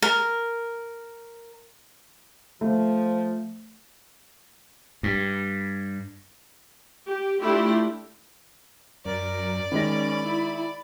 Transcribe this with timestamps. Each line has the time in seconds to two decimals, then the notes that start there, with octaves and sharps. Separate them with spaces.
0.02 A#4
2.61 F3 A3
5.03 G2
7.08 G4
7.40 A3 D4 E4 F4 G4
9.05 F#2 A#4 D5
9.72 D#3 G#3 C#4 B5 A#6
10.23 E4